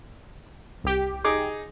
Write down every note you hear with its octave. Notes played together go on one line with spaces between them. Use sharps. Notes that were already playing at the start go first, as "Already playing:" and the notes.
C2 G4
D#4 G#4 D6